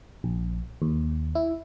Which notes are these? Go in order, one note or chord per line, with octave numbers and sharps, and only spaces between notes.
A#1
D#2
E4